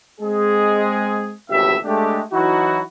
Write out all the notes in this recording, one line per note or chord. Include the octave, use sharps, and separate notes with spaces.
G#3 C4 G#4
G#1 C#2 A2 E3 G4 E5
G#3 A3 D4 G4
E3 F#3 D#4 E4 F#4